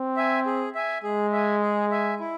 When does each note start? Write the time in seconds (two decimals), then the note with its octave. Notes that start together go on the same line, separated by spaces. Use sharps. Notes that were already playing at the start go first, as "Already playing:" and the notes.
Already playing: C4
0.17 E5 G#5
0.46 G#4
0.75 E5 G#5
1.03 G#3 G#4
1.33 E5 G#5
1.62 G#4
1.91 E5 G#5
2.20 E4